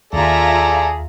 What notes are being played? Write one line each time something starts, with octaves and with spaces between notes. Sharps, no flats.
D#2 F4 G#4 A4 D5 E5 A#5